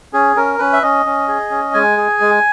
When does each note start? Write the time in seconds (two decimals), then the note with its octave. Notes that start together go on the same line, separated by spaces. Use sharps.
0.13 C#4 G#4
0.36 C#4 A#4
0.59 C#4 B4
0.73 E5
0.82 C#4 D#5
1.06 C#4
1.28 G#4
1.51 C#4
1.74 G#3 G#5
1.97 G#4
2.21 G#3